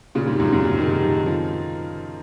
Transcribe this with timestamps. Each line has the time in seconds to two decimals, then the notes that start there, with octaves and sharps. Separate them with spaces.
0.15 A#2 C#3
0.27 G#2 C3
0.40 F#2 A#2
0.52 F#2 A#2
0.65 G#2 C3
0.77 C3 D#3
0.85 C#3
0.90 C3 D#3
1.03 F3
1.14 D#3
1.26 C#3 F3